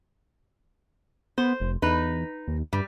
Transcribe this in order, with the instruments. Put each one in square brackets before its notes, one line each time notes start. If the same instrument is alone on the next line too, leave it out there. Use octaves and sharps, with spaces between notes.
[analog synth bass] B3 [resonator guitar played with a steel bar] C5
[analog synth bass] F1
[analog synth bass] E2 [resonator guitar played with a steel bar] D#4 B4
[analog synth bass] D#2
[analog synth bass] G2 [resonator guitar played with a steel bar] G3